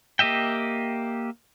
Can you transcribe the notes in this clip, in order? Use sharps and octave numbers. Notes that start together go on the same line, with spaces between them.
A#3 G4 D#5 E5 G5